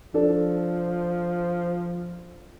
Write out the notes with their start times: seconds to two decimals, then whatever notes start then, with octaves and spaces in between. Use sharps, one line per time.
0.14 F3 D4 A4 D5